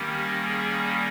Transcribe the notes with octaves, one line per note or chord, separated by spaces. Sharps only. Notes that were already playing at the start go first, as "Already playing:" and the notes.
Already playing: D#3 G3 A#3 C#4 G4
G#4